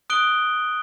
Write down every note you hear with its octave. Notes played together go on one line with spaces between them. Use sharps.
D#6 F#6 D7 G7